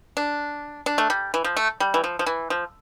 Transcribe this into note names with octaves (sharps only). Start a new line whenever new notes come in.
D4
D4
A3
G3
E3
F3
A3
G3
E3
F3
F3
E3
F3